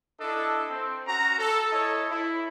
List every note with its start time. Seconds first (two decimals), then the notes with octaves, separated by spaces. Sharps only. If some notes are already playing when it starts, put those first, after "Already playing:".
0.20 D4 E4 A4 D#5
0.70 C4
1.07 C#4 F#4 A#5
1.39 A4
1.72 E4 A4 C#5 D#5
2.11 E4